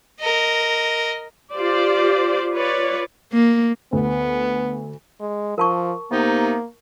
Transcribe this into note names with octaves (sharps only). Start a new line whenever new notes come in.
A#4 D#5
F4 G4 C5 D5
F4 B4 C#5 D5
A#3
D2 B3
G#3
F3 A#4 A5 C#6
C3 A#3 B3 D#4